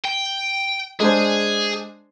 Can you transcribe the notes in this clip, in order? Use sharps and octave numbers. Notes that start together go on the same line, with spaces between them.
G5
G#3 D4 G#4 C5